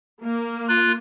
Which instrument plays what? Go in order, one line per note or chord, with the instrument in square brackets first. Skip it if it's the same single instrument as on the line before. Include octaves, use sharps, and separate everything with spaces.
[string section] A#3
[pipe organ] F4 F#6